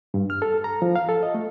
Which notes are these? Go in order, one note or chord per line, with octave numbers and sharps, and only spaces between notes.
G2
F6
A4
A#5
F3
F5
A4
D#5
A3